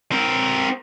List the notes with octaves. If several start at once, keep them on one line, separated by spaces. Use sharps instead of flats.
C4 A#4